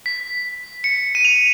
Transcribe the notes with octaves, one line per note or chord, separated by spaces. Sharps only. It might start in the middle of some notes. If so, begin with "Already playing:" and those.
B6
C#7
D#7
F7